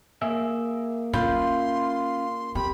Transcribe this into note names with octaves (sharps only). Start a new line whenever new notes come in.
A#3 G#4 E5
C#4 F4 B5 C6 G6
C4 G4 B5